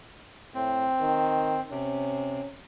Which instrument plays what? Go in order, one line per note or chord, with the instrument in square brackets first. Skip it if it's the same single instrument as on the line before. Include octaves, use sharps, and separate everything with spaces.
[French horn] A2 [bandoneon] C4
[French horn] D#3
[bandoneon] C3 [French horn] C#4